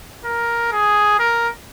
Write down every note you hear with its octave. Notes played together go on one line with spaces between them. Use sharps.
A#4
G#4
A#4